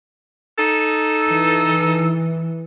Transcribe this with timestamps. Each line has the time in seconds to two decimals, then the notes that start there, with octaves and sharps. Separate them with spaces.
0.58 D#4 A4
1.29 E3